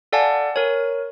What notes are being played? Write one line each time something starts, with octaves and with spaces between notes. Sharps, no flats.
A4 D5 F5 F#5 G#5 A5
A#4 C#5